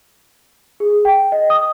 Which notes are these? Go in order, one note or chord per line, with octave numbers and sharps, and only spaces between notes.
G#4
G5
D#5
D#6